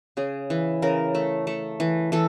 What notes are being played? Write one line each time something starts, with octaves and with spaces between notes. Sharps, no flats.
C#3 G#4
E3
C#3 A#4
A3
A3
E3
E3 A4